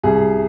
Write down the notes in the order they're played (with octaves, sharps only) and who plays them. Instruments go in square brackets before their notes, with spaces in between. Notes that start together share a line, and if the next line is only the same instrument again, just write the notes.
[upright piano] C2 G#4